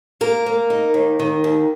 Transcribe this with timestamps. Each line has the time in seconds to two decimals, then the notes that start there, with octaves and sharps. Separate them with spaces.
0.21 A#3 A#4
0.46 A#3
0.70 D#4
0.94 D#2
1.19 D#3
1.44 D#2